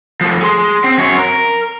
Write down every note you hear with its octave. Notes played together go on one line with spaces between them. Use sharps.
F3 A3
G#4 C6
C4
F#2 C#5
A#4